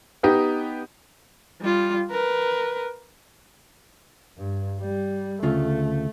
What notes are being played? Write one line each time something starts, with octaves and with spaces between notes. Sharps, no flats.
B3 D#4 G4
G3 F4
A#4 B4
G2
G3
D2 C#3 A3 F4